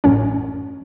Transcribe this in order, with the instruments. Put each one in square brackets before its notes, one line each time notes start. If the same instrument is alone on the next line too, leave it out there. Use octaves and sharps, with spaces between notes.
[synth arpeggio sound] A1 F#2 A2 C#4